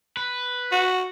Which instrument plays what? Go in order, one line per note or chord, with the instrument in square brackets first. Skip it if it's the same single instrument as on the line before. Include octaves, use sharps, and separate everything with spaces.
[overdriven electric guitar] B4
[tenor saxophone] F#4